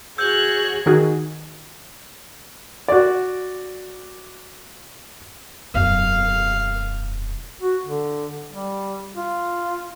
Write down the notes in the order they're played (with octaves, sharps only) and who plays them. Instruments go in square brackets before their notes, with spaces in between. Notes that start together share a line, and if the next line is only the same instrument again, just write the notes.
[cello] F#4 G#4 [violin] C#5 F#6 [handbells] E6 G6
[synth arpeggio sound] D#3 D#4 F#4 G#4
[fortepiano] F#4 D5
[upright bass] E1 F#2 [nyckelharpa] F5
[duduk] F#4
D3
G3
F4